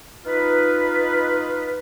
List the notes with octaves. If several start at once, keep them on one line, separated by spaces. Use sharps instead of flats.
D#4 F4 B4